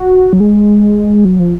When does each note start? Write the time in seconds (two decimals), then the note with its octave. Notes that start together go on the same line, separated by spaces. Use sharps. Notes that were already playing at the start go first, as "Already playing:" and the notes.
Already playing: F#4
0.33 F#3
0.40 G#3
1.25 F#3
1.39 F3